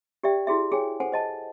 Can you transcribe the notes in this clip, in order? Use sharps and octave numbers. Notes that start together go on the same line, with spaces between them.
G4 D5 E5 G5
E4 F#4 G#4 E5
G#4 C#5 G5 G#5
A4 C5 F#5 G#5
C5 D#5 A5